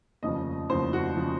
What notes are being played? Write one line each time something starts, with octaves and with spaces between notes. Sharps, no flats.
F1 D#2 C#3 F3 D#5
F1 D#2 C#3 F3 C5
F#4
C#3 F3